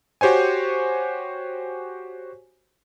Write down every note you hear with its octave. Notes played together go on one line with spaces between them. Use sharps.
F#4 G4 C5 C#5 G#5